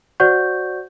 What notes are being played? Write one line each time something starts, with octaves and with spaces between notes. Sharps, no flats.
F#4 C5 D5 F#5 C#6 G6